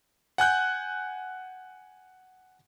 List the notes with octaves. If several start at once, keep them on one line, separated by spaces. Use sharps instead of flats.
F#5 G#5 F#6 G6